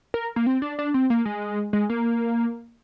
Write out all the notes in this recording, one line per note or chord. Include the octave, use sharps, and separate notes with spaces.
A#4
A#3
C4
D4
D4
C4
A#3
G#3
G#3
A#3